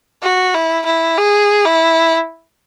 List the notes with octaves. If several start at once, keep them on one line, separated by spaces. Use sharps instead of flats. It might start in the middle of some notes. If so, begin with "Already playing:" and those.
F#4
E4
E4
G#4
E4